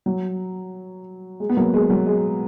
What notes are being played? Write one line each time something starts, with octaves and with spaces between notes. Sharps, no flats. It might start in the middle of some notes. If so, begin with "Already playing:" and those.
F#3
G#3
B3
F#3 A#3
G#3
F#3
G#3